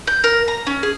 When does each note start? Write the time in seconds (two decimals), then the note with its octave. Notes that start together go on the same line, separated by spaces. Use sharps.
0.07 G6
0.24 A#4
0.48 A#5
0.67 C#4
0.83 G#4